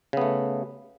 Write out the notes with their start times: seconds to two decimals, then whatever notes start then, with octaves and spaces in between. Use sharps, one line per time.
0.13 C#3
0.17 B3
0.21 A3